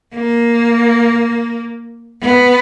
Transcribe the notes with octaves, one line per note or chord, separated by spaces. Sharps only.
A#3
B3